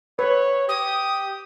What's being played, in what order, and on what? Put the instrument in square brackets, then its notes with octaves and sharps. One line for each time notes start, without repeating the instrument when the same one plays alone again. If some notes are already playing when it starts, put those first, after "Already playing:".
[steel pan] B4 [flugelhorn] C#5
[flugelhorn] G4 [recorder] D#6